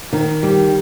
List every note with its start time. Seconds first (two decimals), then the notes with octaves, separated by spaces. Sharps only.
0.13 D#3
0.43 G3